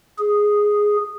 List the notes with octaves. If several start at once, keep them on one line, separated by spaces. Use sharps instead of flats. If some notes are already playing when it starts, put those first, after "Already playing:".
G#4